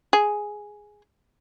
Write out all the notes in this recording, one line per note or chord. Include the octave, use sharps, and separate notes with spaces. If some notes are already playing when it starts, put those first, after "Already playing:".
G#4